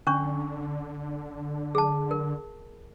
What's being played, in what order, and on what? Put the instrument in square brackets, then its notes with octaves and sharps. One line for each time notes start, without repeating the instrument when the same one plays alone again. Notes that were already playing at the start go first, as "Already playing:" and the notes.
[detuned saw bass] D3 [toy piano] C#4 D4 C#6
[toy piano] G#4 A5
A#4